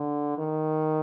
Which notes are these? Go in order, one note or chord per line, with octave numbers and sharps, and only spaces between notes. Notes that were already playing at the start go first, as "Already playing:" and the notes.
Already playing: D3
D#3